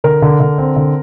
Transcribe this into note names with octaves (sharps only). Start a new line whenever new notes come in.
D3 A#4
D3
D3
C4
D3